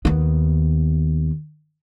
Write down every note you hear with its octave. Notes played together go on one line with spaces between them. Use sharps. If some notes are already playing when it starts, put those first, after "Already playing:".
D#2 B3